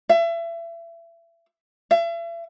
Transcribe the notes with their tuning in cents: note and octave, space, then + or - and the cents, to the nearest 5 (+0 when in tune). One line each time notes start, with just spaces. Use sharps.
E5 +30
E5 +40